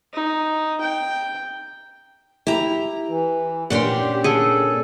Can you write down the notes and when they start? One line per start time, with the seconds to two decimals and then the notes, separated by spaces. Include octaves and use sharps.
0.13 D#4
0.81 G5
2.47 E4 G4 A#5
3.08 E3
3.70 A#2 C#4 D4 F#5 G5 C6
3.84 G4
4.24 G#4 A4 F#5 G5